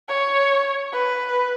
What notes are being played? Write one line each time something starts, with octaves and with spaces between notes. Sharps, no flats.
C#5
B4